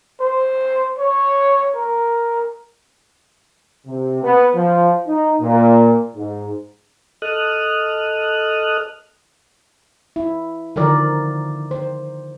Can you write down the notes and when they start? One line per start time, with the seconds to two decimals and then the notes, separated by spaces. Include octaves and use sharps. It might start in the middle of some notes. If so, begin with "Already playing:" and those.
0.21 C5
0.99 C#5
1.75 A#4
3.87 C3
4.23 B3
4.55 F3
5.07 D#4
5.41 A#2
6.16 G#2
7.22 A4 D#5 D#6 F6 F#6
10.16 E4
10.76 D3 D#3 F3 A#4 D5
11.71 C5